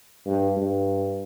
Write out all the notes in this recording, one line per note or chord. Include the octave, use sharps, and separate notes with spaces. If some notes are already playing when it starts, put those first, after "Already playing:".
G2
G2